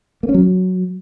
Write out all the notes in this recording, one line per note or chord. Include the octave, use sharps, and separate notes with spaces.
A#3
C#4
F#3